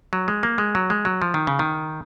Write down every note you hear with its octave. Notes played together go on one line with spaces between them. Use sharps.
F#3
G#3
A#3
G#3
F#3
G#3
F#3
F3
D#3
C#3
D#3